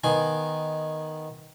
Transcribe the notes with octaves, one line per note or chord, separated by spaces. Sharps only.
D#3 B3 G#5 C6